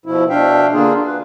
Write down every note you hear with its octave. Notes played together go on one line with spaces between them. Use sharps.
B2 F3 E4
B2 D4 E5 F5 G5
D3 A#3 D4 F4 G#4
B4